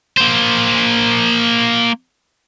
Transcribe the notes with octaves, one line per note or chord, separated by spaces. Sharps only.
A#3 C5